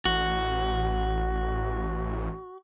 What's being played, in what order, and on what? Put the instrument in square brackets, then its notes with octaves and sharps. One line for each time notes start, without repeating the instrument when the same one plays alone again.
[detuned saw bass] A1 [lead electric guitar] F#4